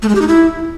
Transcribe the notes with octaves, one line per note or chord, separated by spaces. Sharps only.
A3
G#3
G4
D#4
E4